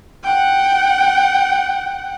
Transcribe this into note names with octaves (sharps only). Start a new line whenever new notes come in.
F#5 G5